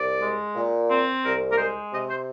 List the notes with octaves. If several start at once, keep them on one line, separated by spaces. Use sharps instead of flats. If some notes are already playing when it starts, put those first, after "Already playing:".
Already playing: C2 D5
G#3
A#2
C4
C2 A#4
A#4
G#3 C5
C3 D#5
C5